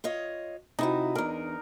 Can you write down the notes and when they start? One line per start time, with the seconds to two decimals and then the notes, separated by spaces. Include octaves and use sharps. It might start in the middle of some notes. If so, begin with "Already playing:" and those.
0.04 F4 C#5 D#5
0.79 C3 D#4 E4 F#4
1.15 E2 D4 A#4